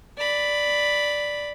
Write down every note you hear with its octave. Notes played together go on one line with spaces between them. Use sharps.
D5 B5